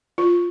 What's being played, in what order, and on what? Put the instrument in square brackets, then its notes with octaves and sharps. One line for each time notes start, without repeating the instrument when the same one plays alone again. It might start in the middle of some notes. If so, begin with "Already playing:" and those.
[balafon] F4